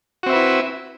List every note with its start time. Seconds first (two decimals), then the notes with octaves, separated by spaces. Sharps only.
0.23 F#4
0.26 C4
0.29 E5
0.33 B4
0.36 E4